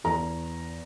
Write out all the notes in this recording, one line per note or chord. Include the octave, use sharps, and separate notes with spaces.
E2 A#5